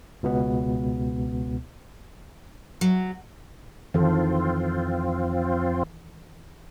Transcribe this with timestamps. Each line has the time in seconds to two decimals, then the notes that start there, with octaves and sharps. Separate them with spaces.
0.23 C#2 B2 B3
2.81 F#3
3.94 F2 D#3 E3 C4 F4 A4